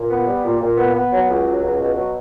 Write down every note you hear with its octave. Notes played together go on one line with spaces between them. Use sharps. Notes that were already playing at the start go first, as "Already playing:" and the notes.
Already playing: A#2
B3
G3
A#2
A#2
B3
B3
F#3
C#2
F#3
C#2
B2
F#3